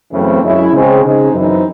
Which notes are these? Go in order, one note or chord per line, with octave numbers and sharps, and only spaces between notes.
F#2 C#3 E3 A3 C4
F#2 C#3 G#3 C#4 E4
C#3 G#3 C4
C#3 G#3 C4 D#4
F#2 E3 C4 D#4